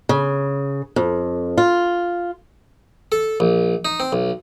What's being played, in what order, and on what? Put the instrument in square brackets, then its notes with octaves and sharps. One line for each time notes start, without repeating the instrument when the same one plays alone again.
[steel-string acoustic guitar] C#3
F2
F4
[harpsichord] A4
A#1
D#4
C4
B1